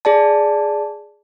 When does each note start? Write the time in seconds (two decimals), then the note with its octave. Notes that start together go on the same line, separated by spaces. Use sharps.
0.05 G#4 D5 A5